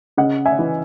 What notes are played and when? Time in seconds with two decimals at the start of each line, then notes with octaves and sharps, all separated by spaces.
0.17 C#3 D#5 F#5
0.46 E5 G#5
0.59 E3